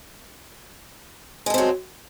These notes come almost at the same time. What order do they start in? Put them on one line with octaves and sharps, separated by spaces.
G#3 A4 C4 F#3